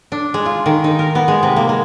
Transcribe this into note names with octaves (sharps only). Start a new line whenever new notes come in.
D4
G#3
F4
D#3
D#4
A#4
B3
G#3
C3
A#3
G#3